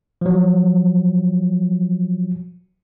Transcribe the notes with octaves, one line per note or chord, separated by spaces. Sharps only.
F3 F#3